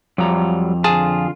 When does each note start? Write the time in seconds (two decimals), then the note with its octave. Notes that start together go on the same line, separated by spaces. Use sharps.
0.18 F2 F#3 G3 A#5
0.84 D3 F4 G#4 A5